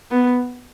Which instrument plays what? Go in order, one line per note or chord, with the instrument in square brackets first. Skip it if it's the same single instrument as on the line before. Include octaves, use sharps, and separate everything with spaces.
[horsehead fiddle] B3